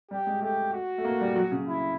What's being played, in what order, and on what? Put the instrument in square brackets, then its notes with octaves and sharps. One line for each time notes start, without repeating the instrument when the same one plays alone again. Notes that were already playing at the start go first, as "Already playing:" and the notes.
[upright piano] G3 [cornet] G4
[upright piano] G#3
[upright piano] A3 [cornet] G4
[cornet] F#4
[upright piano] A3
A#3
G3
F#3
C#3
[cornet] E4